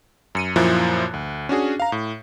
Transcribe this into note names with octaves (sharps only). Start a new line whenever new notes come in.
F#2 C#7 D#7
F#2 A#2 F3 E4 F#6
D2
C#4 D4 F#4 G#4
F5 A#5
A2